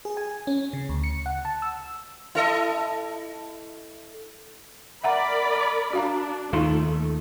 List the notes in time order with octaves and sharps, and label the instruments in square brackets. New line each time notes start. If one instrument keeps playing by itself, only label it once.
[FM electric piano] G#4
G#5
C#4
C#3
D2
C#7
F#5
A5
E6
[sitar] E4 A4 D#5
[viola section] A#4 D5 B5 [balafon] E5 F#5 A#5
[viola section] D4 [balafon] F#4 F5 A#5
[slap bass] D#2 D#3 [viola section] A3 [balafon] D#4 F4 F5